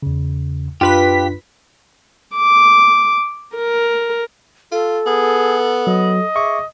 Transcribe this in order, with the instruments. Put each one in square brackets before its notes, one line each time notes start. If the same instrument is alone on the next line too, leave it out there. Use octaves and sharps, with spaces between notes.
[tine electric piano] E2 C#3
[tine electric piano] F#2 D4 [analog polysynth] F4 B4 B6 [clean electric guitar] G4
[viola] D6
A#4
[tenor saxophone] F4 [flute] A4
[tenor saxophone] B3 [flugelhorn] G#4
[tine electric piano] F#3 [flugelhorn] D#5
[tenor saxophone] G#4 [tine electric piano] E5 C#6 D6